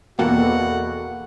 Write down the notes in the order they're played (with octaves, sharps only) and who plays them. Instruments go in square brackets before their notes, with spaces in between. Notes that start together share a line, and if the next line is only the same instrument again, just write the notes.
[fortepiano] E2 B2 G5 [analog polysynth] A#3 A4 [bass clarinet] F#4 [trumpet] F#5